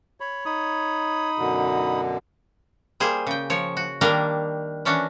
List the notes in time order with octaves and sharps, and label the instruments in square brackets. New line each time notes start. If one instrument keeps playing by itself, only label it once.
[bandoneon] C#5 [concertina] B5
[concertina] D#4 B5 D#6
[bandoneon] F#2 B2 D3
[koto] G3 A#3 G#4 C5
C#3 G5
F3 C#5
F#4
D#3 G3 A#3 D4 A#4
E3 C#4 D4 F#4